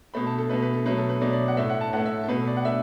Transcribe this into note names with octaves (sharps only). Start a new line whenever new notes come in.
B2 A3 B5
A5
A4
B2 A3 B4
B4
A4
B2 F#3 A3 B4
A4
B4
B2 F#3 A3 D5
D5
F#5
A2 A3 E5
F#5
A5
A2 A3 F#5
E5
A4
B2 A3 B4
D5
F#5
A3 E5